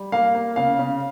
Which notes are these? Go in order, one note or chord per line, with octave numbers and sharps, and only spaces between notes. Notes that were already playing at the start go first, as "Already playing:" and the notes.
Already playing: G3
A#3 F5
A#3
C#3 F5
C#3